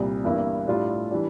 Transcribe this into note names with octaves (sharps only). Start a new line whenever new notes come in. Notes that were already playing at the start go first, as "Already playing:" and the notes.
Already playing: C2 A#2 G3
G1 G2 E3 A#3 E4
A2 G3 D4 F4
E3 G3 D4